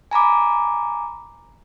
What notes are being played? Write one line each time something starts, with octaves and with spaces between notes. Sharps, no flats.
G#5 A#5 B5 D6